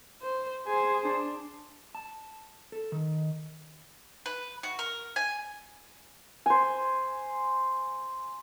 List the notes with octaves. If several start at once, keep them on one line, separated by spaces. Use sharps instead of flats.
C5
G#4 C5 G#5
D4
A5
A4
D#3
B4
F#4
A#4
G#5
C5 G#5